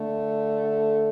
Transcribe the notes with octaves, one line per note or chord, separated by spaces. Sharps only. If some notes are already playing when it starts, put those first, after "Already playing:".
Already playing: D3 A3